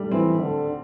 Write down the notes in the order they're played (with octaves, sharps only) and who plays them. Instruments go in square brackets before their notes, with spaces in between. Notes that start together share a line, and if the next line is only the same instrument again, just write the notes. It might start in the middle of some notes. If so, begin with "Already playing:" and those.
Already playing: [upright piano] G3 A3 D4
[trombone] E3 [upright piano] C4
[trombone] D3